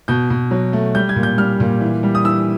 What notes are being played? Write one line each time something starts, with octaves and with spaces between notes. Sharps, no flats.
B2 G6
B2
F#3
A3
G3 G6
G#6
A#2
G6
G3 F6
A#2
E3
G3
D#6
E3 E6